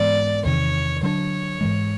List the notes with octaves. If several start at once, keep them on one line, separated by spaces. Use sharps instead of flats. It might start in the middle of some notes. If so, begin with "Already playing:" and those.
Already playing: G#2 E3 G#3 B3 D5
E2 C3 D#3 C#5
D3 F#3 B3 D4 C#5
G#2 E3 G#3